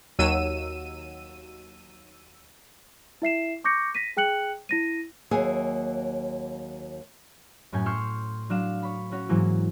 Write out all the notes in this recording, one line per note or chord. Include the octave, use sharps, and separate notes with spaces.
D#2 F#3 E6 D#7
E4 E5 C7 E7
C#6 D6 G6 A#6 C#7
A#6 B6 D#7
G#4 G5 F#6 C#7 F#7
E4 A#6 D#7
D#2 F#3 A#3 G#4 E5 G#5
F#2 A2 C#4 G5 G#5
G5 C6 C#6 E6 F6 G6
F#3 D4 F5 E7
C#5 B5
C#4 F#4 C#5
G#2 E3 F#3 A#3